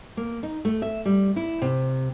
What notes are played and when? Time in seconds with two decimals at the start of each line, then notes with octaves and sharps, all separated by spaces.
0.17 A#3
0.43 D#4
0.65 A3
0.82 E5
1.05 G3
1.36 E4
1.62 C3